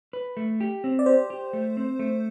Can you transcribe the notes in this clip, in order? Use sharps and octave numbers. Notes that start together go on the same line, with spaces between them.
B4
A3
G4
C4
D5
G4 C5
G4
A3
C4
A3